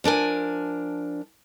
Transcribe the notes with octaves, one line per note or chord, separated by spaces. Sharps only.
F3 D4 A#4 G#5